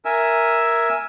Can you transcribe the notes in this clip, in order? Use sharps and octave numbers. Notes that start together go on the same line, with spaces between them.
A#4 E5 G#5 E6